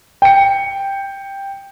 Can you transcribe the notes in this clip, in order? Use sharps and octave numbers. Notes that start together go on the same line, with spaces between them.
G5 C#7